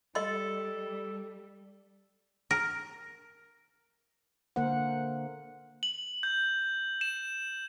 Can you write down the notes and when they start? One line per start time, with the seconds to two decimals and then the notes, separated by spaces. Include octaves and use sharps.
0.15 G3 A4 D#5 C6
2.51 A#4
4.56 D3 A#3 A#4 C5 F#5
5.83 F#7
6.23 G6
7.01 E7